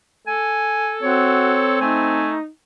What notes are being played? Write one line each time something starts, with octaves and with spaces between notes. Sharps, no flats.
A4 G#5
C4 F#4 C#5
A3 D#4 G#5